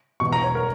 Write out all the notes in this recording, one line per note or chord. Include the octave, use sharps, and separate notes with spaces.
E1 E2 B2 C#6
A#5
C#5
A#4